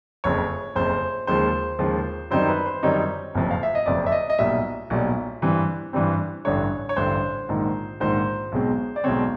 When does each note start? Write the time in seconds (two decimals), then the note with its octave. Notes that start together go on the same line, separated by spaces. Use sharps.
0.24 F#1 F2 C#3 C#5
0.75 F#1 F2 C#3 C5
1.27 D#2 C#3 F3 G#3 C5
1.79 D#2 C#3 F3 G#3
2.31 F#2 D#3 G3 C4 D#4 C5
2.49 B4
2.66 C5
2.83 F#2 D#3 G3 C4 D#4 C#5
3.35 F#1 F2 C3 F3
3.51 F5
3.63 E5
3.75 D#5
3.86 F#1 F2 C3 F3 D5
4.06 E5
4.12 D#5
4.30 D#5
4.39 B1 A#2 G3 E5
4.90 B1 A#2 G3
5.42 G2 E3 G3 C4
5.93 G2 E3 G3 C4
6.45 A1 G2 D3 C#5
6.89 C#5
6.96 A1 G2 D3 C5
7.49 A#1 G#2 D#3
8.00 A#1 G#2 D#3 C5
8.52 B1 B2 G#3 C4
8.96 D5
9.04 B1 B2 G#3 C4 C#5